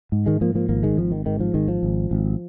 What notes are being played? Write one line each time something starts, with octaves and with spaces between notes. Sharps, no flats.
G#2
D#3 G#3
G#2 F3 A#3
F3 A#3
G#1 F3 A#3
D#3 G#3
G#1 F3
D#3
G#2 D#3
F3
G#1 D#3 G#3
F3
G#1
G#1